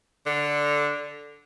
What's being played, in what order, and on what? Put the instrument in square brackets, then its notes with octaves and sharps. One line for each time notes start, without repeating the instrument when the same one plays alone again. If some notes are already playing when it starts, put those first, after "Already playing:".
[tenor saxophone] D3